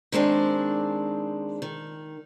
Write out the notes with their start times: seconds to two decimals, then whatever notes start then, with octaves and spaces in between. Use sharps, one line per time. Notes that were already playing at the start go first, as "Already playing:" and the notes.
0.12 D#3 G#3 C4 D4
1.62 D#3